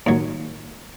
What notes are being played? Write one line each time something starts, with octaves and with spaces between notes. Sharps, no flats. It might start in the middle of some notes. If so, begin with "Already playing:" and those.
D#2 F#3